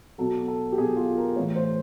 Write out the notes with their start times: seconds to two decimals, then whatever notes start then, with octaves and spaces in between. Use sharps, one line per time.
0.18 B2 F#3 A4
0.48 A4
0.73 G4
0.77 B2 G#4
0.81 F#3
0.97 F4
1.17 A#4
1.36 A2 E3 C#5
1.56 C5